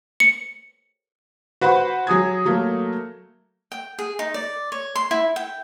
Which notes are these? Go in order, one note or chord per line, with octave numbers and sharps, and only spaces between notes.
C#7
F#4 B4 C5 F#5 B5 C#6
F#3 G#4 D#6 G#6
F#3 A3 A#3
G5
G#4
D#4
D5
C#5
C6
E4
G5